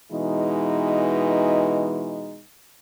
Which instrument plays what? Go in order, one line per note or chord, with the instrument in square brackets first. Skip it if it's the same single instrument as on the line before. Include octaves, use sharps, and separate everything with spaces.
[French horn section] B2 E3 G#3 D#4